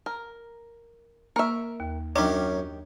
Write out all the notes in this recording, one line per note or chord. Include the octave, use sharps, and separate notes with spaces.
A#4 A#5
A#3 A#4 E5 C#6
D#2
F#2 D#3 C#4 D4 G4